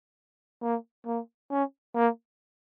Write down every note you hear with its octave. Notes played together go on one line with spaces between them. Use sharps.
A#3
A#3
C#4
A#3